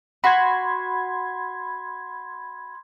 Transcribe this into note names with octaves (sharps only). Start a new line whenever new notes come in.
F#4 B5 C6 G#6